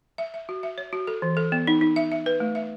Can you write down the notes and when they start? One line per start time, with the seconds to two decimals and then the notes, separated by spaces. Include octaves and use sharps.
0.18 E5
0.34 E5
0.49 F#4
0.63 E5
0.78 C#5
0.93 F#4
1.07 A4
1.22 E3
1.37 A4
1.52 B3
1.67 D#4
1.81 D#4
1.96 E5
2.12 E5
2.26 B4
2.40 A3
2.55 E5